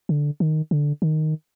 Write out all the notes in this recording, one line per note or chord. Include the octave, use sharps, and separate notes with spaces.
D3
D#3
D3
D#3